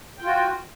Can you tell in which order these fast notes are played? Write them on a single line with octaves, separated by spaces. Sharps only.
G5 F4 F#4